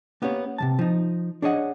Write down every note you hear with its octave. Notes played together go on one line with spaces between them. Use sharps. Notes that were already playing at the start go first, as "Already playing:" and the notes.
A#3 B3 C#4 G4 C#5
C3 F3 A5
F3 D#4
D4 G#4 C#5 D#5 F#5